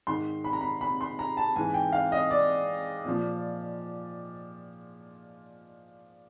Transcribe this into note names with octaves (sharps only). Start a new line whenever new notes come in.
G#2 D#3 C6
B5
A#5
B5
B5
C6
A#5
A5
G#2 E3 G#5
G5
F5
D#5
D5
A#2 F3